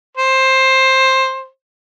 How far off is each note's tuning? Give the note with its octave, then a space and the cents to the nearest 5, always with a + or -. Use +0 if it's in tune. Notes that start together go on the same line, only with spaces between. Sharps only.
C5 +15